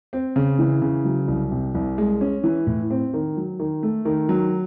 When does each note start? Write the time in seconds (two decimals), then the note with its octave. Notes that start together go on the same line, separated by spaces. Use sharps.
0.13 C4
0.36 C#3
0.59 E3
0.82 C#3
1.05 F#3
1.28 C2
1.52 C3
1.75 C2
1.98 G#3
2.21 C#4
2.44 E3
2.67 A2
2.90 C4
3.14 D#3
3.37 F#3
3.59 D#3
3.83 A3
4.05 D#3
4.29 F#3